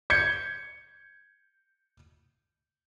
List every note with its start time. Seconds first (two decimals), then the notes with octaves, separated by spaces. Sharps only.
0.10 G6 G#6 C#7